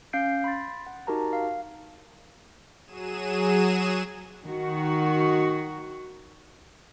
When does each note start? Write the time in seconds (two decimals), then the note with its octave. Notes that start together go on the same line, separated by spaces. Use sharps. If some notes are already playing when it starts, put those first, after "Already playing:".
0.13 C#4 F5 G6 C7 D7
0.44 B5 C6 A6
0.87 F#5
1.07 D#4 F#4 G4 A#4 A5 A#5
1.33 F5
2.85 F#3 G#4 D#7 E7
4.46 D#3 F#4